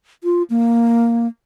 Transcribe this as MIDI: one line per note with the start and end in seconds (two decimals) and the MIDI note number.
0.24 0.43 65
0.50 1.27 58